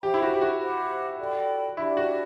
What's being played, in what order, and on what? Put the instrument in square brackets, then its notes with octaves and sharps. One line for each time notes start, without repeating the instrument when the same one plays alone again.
[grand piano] G4 [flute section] C5 E5 G5 B5
[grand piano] E4
F#4
G4
F#4
[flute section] G4 C5 F#5 B5
A4 D5 G5 B5
[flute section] D4 G4 D5 [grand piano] E4
[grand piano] F#4